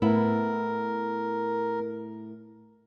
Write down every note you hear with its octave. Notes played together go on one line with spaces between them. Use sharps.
A2 B3 E4 A#4